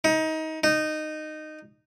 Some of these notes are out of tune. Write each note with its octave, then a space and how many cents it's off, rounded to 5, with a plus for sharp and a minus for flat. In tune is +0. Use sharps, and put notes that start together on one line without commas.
D#4 +25
D#4 -15